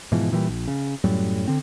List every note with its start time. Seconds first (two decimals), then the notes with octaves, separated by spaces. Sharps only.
0.12 G#2 B2 E3 F3
0.32 A#2 E3 F3 G3
0.49 A#1
0.68 C#3
1.04 F#2 A2 F#3 G3
1.47 D3 C4